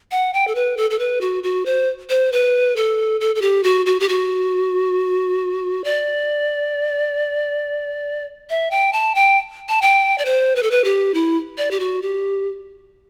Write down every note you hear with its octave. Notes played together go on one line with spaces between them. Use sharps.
F#5
G5
A4
B4
A4
A4
B4
F#4
F#4
C5
C5
B4
A4
A4
A4
G4
F#4
F#4
G4
F#4
D5
E5
G5
A5
G5
A5
G5
D5
C5
B4
A4
B4
G4
E4
D5
G4
F#4
G4